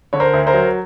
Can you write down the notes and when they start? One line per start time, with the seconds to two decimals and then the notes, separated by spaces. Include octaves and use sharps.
0.13 D3 C#5
0.20 A#4 C5
0.33 D2
0.47 A#4 C5
0.54 F#3